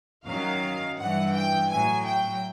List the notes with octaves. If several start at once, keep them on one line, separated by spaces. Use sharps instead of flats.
F#2 D#3 F#3 F5
G2 E3 F#5
G5
A2 F#3 G#5
G5